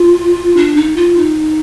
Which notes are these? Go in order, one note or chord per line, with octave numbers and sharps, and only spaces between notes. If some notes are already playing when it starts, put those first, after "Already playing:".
Already playing: F4
D4
D#4
F4
D#4